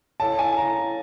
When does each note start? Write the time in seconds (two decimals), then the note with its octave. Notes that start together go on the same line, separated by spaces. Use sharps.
0.20 E4 A4 C#5 F5 A5
0.39 G#5
0.57 A#5